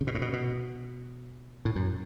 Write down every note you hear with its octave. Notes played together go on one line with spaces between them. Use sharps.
C#3
B2
A2
B2
B2
A2
F#2